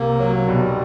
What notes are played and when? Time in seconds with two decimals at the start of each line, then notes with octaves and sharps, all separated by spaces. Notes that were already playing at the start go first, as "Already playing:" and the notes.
Already playing: C2 C3 A#3
0.19 F#3
0.48 B1 B2 G3